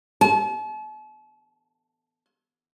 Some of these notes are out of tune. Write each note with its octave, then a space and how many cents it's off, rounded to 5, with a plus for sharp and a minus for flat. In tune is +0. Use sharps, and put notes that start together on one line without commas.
A5 -40